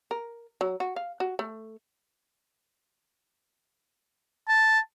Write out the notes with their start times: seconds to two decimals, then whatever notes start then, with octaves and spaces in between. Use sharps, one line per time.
0.11 A#4
0.61 F#3
0.80 F#4
0.96 F5
1.20 F#4
1.39 A3
4.48 A5